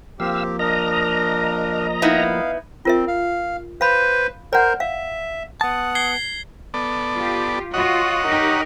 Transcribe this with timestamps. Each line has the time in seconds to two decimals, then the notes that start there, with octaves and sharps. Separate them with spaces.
0.20 F3 A#3 C4 G4 F5 E6
0.59 D4 A#4 D#5 A#5
2.02 B3 D#4 E4 F5
2.85 C4 F4 A#4 E5
3.08 F5
3.81 B4 C5 F5 B5
4.53 A#4 C5 D5 F#5
4.80 E5 F5
5.61 B3 F#5 A5 D#6
5.95 G#6 C7 G7
6.74 B3 A4 D5
7.15 F4 G4
7.74 F4 F#4 C#5 D#5 F#5
8.27 D#4 G4 A#4